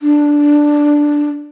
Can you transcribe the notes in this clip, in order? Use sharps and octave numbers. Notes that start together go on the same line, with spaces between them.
D4